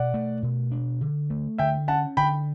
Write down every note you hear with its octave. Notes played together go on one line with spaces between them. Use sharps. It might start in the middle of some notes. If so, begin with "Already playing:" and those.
Already playing: B2 D5 F#5
A3
B2
D4
D3
A3
D3 E5 G5
C#4 F#5 A5
D3 G5 B5